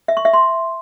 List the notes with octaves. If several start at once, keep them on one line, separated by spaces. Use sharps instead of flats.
E5
C#6
E5
C6